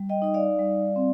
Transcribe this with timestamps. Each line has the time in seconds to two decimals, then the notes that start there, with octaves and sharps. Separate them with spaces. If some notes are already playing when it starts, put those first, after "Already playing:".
Already playing: G3
0.09 D#5 G5
0.22 D#4 D#5
0.34 D5 F5
0.59 G3
0.96 C4